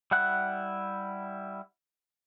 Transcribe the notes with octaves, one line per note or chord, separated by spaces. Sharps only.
G3 E4 F#5 F#6